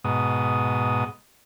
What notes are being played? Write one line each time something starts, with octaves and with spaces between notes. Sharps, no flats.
G#2 B2 D#6